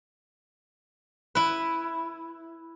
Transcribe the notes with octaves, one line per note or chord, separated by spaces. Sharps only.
E4 B4